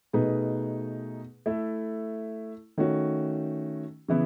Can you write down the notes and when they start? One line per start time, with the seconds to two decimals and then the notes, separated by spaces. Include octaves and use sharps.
0.13 B2 A3 D#4 G#4 B4
1.46 A3 E4 A4
2.78 D#3 A3 C#4 F#4
4.08 C#3 E3 B3 E4